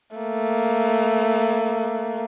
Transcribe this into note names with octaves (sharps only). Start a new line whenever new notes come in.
A3 A#3